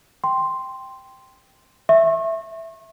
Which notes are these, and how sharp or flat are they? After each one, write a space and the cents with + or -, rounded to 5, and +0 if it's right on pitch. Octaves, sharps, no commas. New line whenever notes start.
G5 +0 C6 +0
E5 +0 C#6 -35